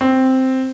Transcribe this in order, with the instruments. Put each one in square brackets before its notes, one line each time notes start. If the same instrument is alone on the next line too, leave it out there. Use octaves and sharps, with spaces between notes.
[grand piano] C4